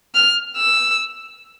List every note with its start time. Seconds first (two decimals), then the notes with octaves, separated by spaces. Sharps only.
0.15 F6
0.57 E6